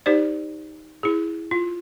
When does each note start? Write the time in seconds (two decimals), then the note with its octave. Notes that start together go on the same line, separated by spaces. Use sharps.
0.06 D#4 G4 C5 D5
1.03 E4 G#4
1.51 F4